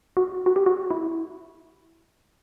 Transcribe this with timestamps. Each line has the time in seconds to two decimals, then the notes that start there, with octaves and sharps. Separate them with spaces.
0.17 F#4
0.46 F#4
0.56 G4
0.66 F#4
0.90 E4